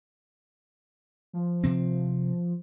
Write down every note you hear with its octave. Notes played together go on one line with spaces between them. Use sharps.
F3
C3 C4